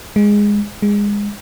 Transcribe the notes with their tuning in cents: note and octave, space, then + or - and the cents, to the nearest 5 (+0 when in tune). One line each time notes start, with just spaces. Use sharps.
G#3 -10
G#3 -20